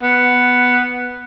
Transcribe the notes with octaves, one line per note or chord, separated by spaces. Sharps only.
B3